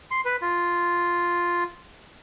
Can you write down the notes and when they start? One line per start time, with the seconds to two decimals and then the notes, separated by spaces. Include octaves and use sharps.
0.11 C6
0.25 B4
0.42 F4